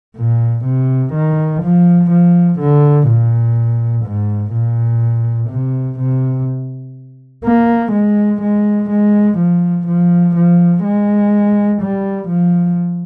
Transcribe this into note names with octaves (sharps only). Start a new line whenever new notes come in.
A#2
C3
D#3
F3
F3
D3
A#2
G#2
A#2
C3
C3
A#3
G#3
G#3
G#3
F3
F3
F3
G#3
G3
F3